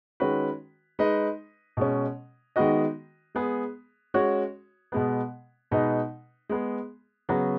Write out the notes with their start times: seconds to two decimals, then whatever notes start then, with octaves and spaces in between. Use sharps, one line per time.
0.20 D#3 G#3 C#4 F#4 B4
0.99 G#3 D#4 B4 D#5
1.77 B2 G#3 C#4
2.56 D#3 G#3 B3 F#4 D#5
3.35 G#3 B3 G#4
4.14 G#3 C#4 F#4 C#5
4.92 B2 G#3 B3
5.71 B2 G#3 D#4 B4 D#5
6.49 G#3 B3 G#4
7.29 C#3 F#3 B3 F#4